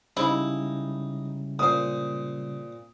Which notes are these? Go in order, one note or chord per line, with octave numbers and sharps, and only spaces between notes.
C#3 G3 G#3 D#4 E4
A#2 C5 D#6